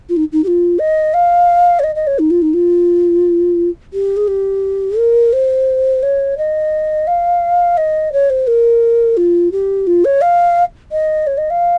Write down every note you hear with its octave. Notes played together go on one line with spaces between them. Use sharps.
F4
D#4
D#4
G4
F4
D#5
F5
C#5
D#5
D#5
C#5
D#4
F4
D#4
F4
G4
G#4
G4
A#4
C5
C#5
D#5
F5
D#5
C#5
C5
A#4
F4
G4
F4
C#5
F5
D#5
C#5
D#5
F5